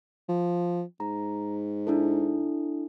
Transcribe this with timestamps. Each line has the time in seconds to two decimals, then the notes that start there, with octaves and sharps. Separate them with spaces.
0.29 F3
1.00 G#2 A#5
1.87 D4 E4 A4